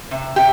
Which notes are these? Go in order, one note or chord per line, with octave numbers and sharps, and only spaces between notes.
C3
C3 G4